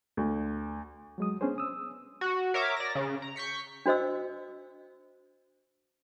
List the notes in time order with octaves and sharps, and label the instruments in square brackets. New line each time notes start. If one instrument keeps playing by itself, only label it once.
[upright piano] D2
[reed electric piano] F#3 G#3 D#6
B3 C#4 D4 G#4 C5
D#6 E6
[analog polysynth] F#4
A#4 C#5 E5 D6
D5 A#6
C#3
A#5
C#6 G6 B6 C#7
[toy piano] D4 F#4 C5 D#5 E6